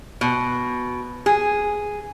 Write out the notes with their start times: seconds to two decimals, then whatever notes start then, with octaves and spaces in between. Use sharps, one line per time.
0.21 B2
1.26 G#4